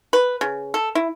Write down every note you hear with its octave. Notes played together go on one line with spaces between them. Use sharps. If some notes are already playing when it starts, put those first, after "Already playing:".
B4
C#3
A4
E4